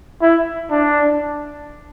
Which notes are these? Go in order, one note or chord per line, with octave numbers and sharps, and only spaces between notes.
E4
D4